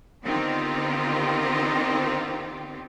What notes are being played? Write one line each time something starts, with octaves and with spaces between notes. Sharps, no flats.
D3 D#3 B3 C4 F4 G4